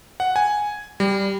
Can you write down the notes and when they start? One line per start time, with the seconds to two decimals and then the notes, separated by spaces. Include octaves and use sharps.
0.20 F#5
0.36 G#5
1.00 G3